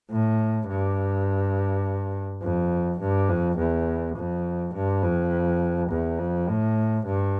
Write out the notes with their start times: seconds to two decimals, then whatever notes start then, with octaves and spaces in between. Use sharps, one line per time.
0.11 A2
0.68 G2
2.42 F2
3.00 G2
3.29 F2
3.58 E2
4.16 F2
4.74 G2
5.03 F2
5.90 E2
6.19 F2
6.48 A2
7.06 G2